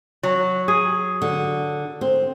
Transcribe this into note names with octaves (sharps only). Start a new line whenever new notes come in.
F#3
G#4
D3
C4